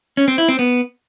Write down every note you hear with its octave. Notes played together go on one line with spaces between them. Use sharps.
C#4
C4
E4
C4
B3